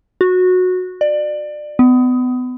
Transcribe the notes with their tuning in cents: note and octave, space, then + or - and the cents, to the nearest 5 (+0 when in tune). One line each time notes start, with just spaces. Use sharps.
F#4 -15
D5 +25
B3 +30